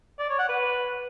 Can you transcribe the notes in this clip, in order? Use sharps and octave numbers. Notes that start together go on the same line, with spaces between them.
D5
C#5
F#5
B4